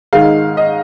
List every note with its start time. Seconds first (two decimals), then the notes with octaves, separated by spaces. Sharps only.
0.13 G#2 D#3 G#3 F5
0.57 D#5